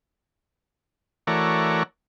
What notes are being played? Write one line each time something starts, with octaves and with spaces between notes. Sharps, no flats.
E3 A3 F#4 A#4 C#5 D5